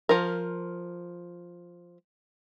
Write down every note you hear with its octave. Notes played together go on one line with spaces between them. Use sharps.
F3 A#4